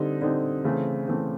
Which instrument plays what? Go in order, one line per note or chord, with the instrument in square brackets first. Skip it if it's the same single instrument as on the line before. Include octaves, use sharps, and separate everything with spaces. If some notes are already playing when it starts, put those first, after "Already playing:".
Already playing: [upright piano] D3 G3 C4 D#4
D3 G3 C4 D#4
C#3 E3 A3 C4
C#3 E3 A3 C4